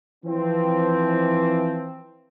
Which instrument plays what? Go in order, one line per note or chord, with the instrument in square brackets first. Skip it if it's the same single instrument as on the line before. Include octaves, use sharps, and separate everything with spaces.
[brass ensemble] E3 F3 C4